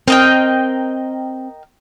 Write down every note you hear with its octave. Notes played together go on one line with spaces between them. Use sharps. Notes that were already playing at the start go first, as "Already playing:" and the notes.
C4 A#4 D#5 G5